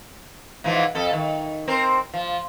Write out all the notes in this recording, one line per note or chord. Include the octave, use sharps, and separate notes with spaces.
G#2 E3 F3
F2 A4
D#3
C4 A#4 C5
F3